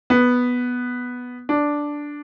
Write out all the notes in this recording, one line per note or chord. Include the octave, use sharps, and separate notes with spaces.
B3
D4